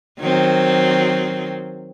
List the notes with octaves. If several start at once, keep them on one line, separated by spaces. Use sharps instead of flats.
D#3 F#3 C4